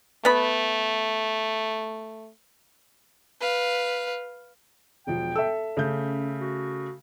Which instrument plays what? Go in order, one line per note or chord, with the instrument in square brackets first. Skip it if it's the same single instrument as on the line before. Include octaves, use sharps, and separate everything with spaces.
[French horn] A3 [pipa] B3 B5
[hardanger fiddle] B4 F5
[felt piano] E1 F3 [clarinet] G5
[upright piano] A4 E5 [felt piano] E6
[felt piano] C#3 A3 G6 [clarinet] C#4
[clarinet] F#4